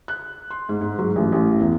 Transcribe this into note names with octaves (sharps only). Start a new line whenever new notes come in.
F#6
C6
G#2
G#2
F#3
A1
A1
E2